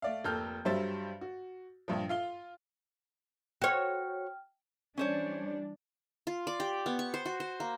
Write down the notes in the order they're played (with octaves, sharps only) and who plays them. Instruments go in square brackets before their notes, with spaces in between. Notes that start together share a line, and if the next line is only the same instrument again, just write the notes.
[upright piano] A3 D5 F5
F1 A#3 A4 F6 G6
G2 F#3 G3 C5 E5 A6
F#4
A#1 G2 F3
F4 F5 G7
[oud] F#4 C#5 [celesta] G5 F6
[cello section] E3 G3 D4 [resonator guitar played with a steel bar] C#4 C5 C#5
[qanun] F4
D5
G4
B3
C#6
C5
F#4
C5
A#3